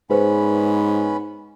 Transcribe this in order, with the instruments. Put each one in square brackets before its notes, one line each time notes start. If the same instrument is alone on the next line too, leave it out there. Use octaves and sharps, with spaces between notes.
[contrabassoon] G#2 [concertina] B3 C#4 B5 [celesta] G#4 B4 C5